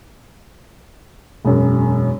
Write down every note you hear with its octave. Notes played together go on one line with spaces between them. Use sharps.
E1 F#2